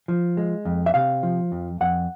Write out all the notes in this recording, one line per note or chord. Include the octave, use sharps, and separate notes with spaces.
F3
G#3
F2
E5
C3 F5
F3
F2
F2 F#5